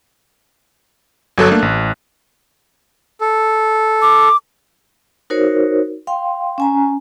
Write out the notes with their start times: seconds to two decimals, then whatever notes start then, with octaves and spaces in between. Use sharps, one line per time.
1.38 G1 F#3 A4 F#6
1.51 A3 A#3 D4
1.62 A1
3.21 A4
4.02 D6
5.30 D#4 F#4 A#4 C5 C#5
6.07 F5 G5 C6
6.58 C#4 G#5 A#5